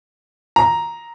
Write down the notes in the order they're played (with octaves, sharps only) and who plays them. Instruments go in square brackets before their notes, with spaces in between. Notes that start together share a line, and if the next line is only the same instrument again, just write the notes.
[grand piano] A#5